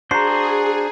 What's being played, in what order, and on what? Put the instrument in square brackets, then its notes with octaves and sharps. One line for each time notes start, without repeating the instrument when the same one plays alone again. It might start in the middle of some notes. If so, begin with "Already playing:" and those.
[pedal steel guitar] D4 F#4 C5 [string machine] G#4 [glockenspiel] A#5 C7